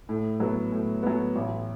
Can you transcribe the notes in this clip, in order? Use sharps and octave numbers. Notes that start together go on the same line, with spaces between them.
A2
F#3 B3
A2
F#3 B3
A1